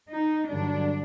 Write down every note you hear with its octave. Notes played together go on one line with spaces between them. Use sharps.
D#4
G2 D3 F#3 D4